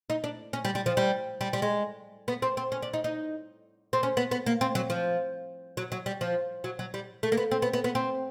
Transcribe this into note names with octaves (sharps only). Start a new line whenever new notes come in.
D#4
D4
C#4
G3
G3
F3
G3
G3
G3
G#3
B3
C4
C4
C#4
D4
D#4
D#4
C4
C#4
B3
B3
A#3
C4
F#3
F3
F#3
F#3
G3
F3
F#3
F#3
G3
A3
A#3
B3
C4
B3
B3
B3
C4